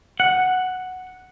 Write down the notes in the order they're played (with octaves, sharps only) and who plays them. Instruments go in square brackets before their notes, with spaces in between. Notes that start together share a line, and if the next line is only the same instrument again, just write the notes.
[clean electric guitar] F#5